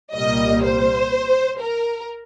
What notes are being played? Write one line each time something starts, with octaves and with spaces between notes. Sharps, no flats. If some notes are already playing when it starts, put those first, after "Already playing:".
C2 A#2 G3 A#3 D#5
C5
A#4